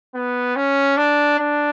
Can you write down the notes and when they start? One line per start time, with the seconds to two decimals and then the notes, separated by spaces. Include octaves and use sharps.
0.15 B3
0.56 C#4
0.97 D4
1.39 D4